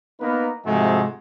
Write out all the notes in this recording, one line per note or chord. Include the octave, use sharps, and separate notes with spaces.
A#3 B3 D#4 A#4 B4
G#2 C3 F3 G#3 A3 F#4